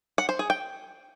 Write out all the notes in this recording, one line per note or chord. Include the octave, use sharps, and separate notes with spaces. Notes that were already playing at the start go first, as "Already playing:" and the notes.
F#5
C5
G#4
G5